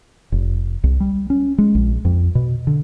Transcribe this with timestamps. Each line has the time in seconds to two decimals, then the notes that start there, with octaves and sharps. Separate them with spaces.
0.32 F1
0.84 C2
1.00 G3
1.30 C#4
1.58 G#3
1.75 A#1
2.05 F2
2.35 B2
2.67 D3